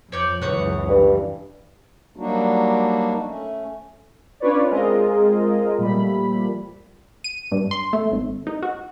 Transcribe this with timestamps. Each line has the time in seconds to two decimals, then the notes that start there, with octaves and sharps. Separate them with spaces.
0.12 F2 C#5 D5 G6
0.41 C#2 F#2 E3 B3 C#5 F#5
0.88 G2
2.16 F#3 G3 A#3 D4 D#4 F#4
3.24 A3 C#4
4.40 C#4 D4 F4 B4 C#5 D5
4.70 G#3 C4 F4 G#4 A#4 D#5
5.78 A#2 F3 G3 A3 B5
7.24 D#7
7.52 G2
7.71 C6
7.93 A3
8.12 G#1
8.47 D#4
8.62 F#4